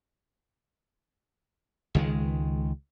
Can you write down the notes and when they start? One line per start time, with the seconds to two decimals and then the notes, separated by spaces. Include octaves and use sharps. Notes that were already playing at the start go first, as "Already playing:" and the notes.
1.95 C#2 D#3 G#3